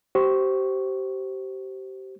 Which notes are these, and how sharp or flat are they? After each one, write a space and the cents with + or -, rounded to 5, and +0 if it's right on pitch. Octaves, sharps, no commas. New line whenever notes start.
G4 -30 C5 +0 C#6 +0